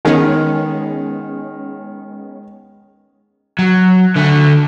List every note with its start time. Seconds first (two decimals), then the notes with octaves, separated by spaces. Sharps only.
0.05 D#3 G#3 B3 C#4
3.59 F#3
4.16 D3 A3